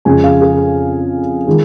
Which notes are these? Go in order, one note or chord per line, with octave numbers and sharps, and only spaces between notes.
F2 C#3 G#3 G#5
F5
G#4
D#3 G#3 F4